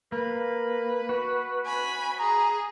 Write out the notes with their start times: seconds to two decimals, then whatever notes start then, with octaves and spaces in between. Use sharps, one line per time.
0.12 A#3 B4
1.09 F#4
1.66 G#5 B5
2.19 G#4 A#5